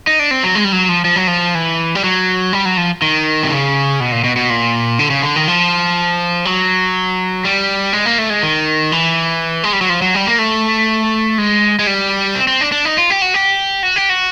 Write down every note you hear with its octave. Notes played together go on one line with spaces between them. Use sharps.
D#4
D4
C4
F#3
G#3
G3
F#3
F3
F3
F#3
F3
E3
G3
F#3
G3
F#3
F3
D#3
C3
C#3
B2
A#2
B2
B2
A#2
D3
C#3
D3
D#3
F3
F#3
G3
G#3
A#3
A3
G#3
D#3
E3
G#3
G3
F#3
F3
F#3
G3
A#3
A3
G#3
G#3
G3
C4
C4
D4
D4
D#4
F4
G4
F#4
G4
F#4
G4
F#4